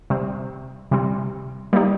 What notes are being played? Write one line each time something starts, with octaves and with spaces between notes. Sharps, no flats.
C3 G3 C4
C3 G3 C4
G3 A#3 D#4 G4